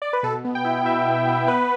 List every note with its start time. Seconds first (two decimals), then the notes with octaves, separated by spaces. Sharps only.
0.02 D5
0.13 B4
0.23 B2 A4
0.45 B3
0.55 G5
0.65 E4
0.85 B2 E5
1.07 B2
1.27 B3
1.47 B3 B4